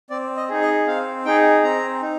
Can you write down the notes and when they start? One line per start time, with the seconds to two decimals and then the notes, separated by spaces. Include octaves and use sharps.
0.10 C4 D5
0.37 D#5
0.49 D#4 G#4
0.62 D#5
0.87 C4 F5
1.25 D#4 G#4 G5
1.64 C4 A#5
2.02 D#4